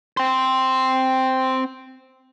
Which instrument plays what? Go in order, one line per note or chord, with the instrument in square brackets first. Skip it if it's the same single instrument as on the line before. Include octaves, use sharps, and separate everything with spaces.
[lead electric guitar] C4 C5